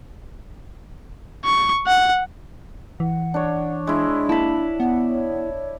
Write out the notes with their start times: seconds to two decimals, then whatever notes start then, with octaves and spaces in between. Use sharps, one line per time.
1.45 C#6
1.87 F#5
3.00 E3 F#5
3.34 D4 C#5
3.87 G#3 D4 E4
4.29 A#3 E4 A5 B5
4.80 B3 F#5
5.10 C#5